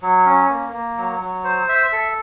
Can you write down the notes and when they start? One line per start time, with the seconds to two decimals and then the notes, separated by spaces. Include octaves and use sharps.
0.02 F#3
0.26 C#4
0.49 A#3
0.73 A#3
0.97 F#3
1.21 F#3
1.44 C5
1.69 E5
1.92 A4